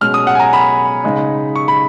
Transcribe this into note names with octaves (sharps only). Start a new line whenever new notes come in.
B2 G#3 C#4 F6
D#6
F#5
G#5
A#5
B5
C#3 G#3 D#4
C#6
B5